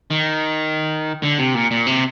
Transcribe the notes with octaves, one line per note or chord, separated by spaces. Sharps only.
D#3
D3
C3
A#2
A#2
C3